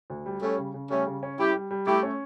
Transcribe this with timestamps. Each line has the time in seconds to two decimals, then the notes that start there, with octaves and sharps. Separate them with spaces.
0.10 D2
0.26 G3
0.42 G3 A3 C#4
0.58 C#3
0.74 C#3
0.90 G3 A3 C#4
1.06 C#3
1.23 C#4
1.38 G3 E4 G4
1.54 G3
1.71 G3
1.86 A3 E4 G4
2.03 C#4